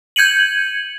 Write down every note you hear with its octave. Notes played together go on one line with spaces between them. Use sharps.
G6 G#6 C#7 D#7 F#7